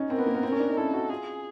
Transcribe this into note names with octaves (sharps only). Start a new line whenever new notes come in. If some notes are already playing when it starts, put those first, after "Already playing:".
Already playing: C#4 D#4
C4 A#4
B3
A#3
B3
C4
C#4
D4
D#4
E4 A4
F#4
F4 G#4